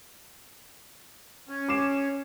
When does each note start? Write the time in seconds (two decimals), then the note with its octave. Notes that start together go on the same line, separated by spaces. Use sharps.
1.49 C#4
1.69 D6 C7 E7